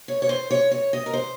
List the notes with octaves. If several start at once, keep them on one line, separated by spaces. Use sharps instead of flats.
C#5
C#5
C5
C#5
C#5
D#5
A#4
C5